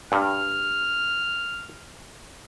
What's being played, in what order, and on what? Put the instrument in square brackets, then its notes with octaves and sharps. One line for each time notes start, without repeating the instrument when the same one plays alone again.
[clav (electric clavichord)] G2 [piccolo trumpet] F6